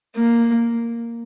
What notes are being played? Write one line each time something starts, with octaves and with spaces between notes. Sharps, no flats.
A#3